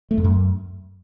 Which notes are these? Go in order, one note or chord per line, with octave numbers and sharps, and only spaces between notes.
A3
F2
F#2